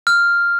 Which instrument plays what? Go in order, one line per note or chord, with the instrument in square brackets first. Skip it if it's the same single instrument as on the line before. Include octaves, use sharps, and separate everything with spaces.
[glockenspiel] F6